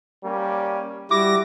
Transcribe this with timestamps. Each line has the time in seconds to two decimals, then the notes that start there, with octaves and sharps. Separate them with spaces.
0.24 G3 A#3 C#4
1.11 G3 E4 F#4 D6 A#6